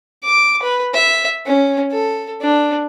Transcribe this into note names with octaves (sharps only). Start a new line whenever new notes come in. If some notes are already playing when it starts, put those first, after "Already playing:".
D6
B4
E5
C#4
A4
D4